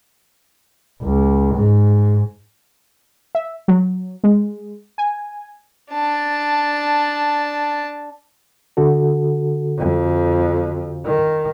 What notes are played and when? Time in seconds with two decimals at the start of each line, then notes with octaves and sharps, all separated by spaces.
1.02 C#2
1.55 G#2
3.35 E5
3.68 F#3
4.24 G#3
4.98 G#5
5.92 D4 A5
8.77 D3 F#4 A4
9.78 F2
11.05 D#3